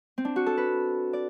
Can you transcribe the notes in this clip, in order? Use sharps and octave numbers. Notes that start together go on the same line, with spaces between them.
C4
D4
F#4
A4
B4
D5